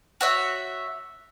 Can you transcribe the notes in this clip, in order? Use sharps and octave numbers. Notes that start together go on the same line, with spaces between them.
F#4 C#5 E5